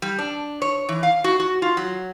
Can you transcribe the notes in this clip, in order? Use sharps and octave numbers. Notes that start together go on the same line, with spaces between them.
G3
D4
C#5
E3
F5
F#4
F#4
F4
F#3